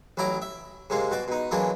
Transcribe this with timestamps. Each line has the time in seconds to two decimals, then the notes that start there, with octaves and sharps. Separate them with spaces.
0.17 A1 F#3 E4 A#5 D6
0.42 E5
0.90 G#2 C3 G#3 A#3
1.11 B2 F#4 D5
1.28 B2 D#4
1.51 E3 F#3 G#3 A#3 D4